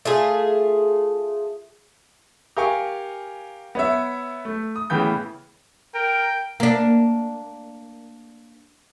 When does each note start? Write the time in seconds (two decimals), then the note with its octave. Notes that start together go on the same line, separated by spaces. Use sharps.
0.05 A3 F4 G#4
2.57 G4 A#4 F5 G#5 C#6
3.75 B3 C#5 E5
4.45 A3
4.76 D#6
4.90 A2 C#3 E3 B3 G5 G6
5.95 A#4 G5
6.60 A#3 D4